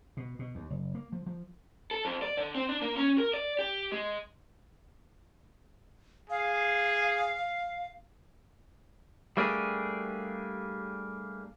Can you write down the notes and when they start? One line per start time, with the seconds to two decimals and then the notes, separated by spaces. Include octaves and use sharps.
0.17 B2
0.39 B2
0.55 D#2
0.70 F#1
0.95 A#3
1.12 F3
1.26 F3
1.91 A4
2.05 F2
2.22 D5
2.37 D3
2.55 C4
2.69 D4
2.82 A#3
2.97 C#4
3.18 A#4
3.34 D5
3.59 G4
3.92 G#3
6.30 G#4 F5
9.37 G3 A3 A#3 D4 G4 G#4